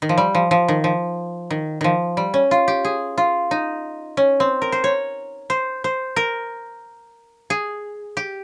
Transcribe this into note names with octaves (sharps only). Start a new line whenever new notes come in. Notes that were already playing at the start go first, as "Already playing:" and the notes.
D#3
F3
G3
F3
F3
D#3
F3
D#3
D#3 F3
G3
C#4
F4
G4
G#4
F4
D#4
C#4
C4
A#4
C5
C#5
C5
C5
A#4
G#4
G4